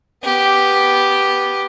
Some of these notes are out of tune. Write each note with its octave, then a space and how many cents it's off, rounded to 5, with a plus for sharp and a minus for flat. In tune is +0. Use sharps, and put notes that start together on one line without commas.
B3 +0 G4 +0